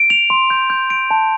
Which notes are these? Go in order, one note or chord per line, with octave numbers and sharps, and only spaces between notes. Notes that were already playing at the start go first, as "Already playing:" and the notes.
Already playing: D7
F7
C6
G6
G6
D7
A5